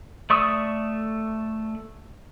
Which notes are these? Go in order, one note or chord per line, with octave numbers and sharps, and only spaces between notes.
A3 D5 C#6 D#6 E6